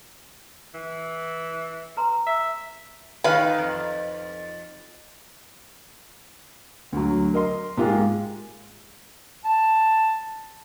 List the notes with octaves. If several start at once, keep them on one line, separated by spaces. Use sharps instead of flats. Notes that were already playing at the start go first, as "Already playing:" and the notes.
E3
B4 A#5 C6
E5
D#3 B4 F5
F2
D2 F#3
A#4 D#5 C6
G#2 G#3 A#3 F4 G4 G#4
A5